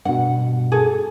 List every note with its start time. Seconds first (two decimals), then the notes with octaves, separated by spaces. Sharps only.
0.05 G2 B2 F#5
0.72 G#4 A4